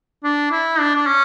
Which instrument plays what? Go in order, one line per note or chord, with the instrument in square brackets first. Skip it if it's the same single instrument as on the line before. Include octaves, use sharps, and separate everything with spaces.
[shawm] D4
E4
D4
D4
C#4